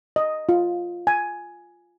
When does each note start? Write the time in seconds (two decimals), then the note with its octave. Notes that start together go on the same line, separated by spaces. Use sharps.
0.16 D#5
0.49 F4
1.07 G#5